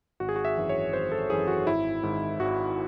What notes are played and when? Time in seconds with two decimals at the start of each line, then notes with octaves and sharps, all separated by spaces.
0.20 G#1 F#4
0.29 G#4
0.36 F#4
0.45 E5
0.57 F#2 E3
0.69 C#5
0.93 G#1 C5
1.12 A4
1.30 F#2 E3 G#4
1.47 F#4
1.67 G#1 E4
2.03 G#2 D#3
2.40 G#1 F#4